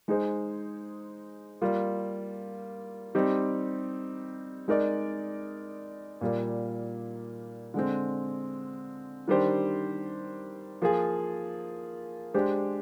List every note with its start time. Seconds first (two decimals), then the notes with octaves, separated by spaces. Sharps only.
0.08 G#3 D#4 G#4 C5
1.62 G3 A#3 F4
3.15 G3 C4 D#4 G4
4.68 G#3 D#4 A#4 D5
6.21 A#2 G3 A#3
7.74 D3 G#3 C4
9.28 D#3 G3 D4 G4 C5
10.82 F3 A#3 F4 G#4
12.34 G#3 D4 G4 C5